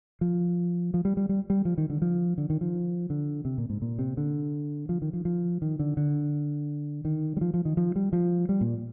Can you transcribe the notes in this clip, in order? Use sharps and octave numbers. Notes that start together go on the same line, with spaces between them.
F3
F3
G3
G3
G3
G3
F3
D#3
D3
F3
D3
D#3
F3
D3
C3
A#2
G#2
A#2
C3
D3
F3
D#3
F3
F3
D#3
D3
D3
D#3
G3
F3
F3
D#3
F3
G3
F3
G3
A#2